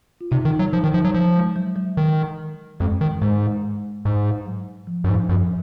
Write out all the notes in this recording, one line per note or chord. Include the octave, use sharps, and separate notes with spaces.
F4
C3 D#4
D#3
D#4
F#3
F3 D#4
D#3
F3 D#4
F#3
F3
G#3
F#3
F#3
D#3 F#3
F2 G#3
D#3
G#2 G#3
G#2
F#3
F3
F#2
G#2 F3
F#2 F3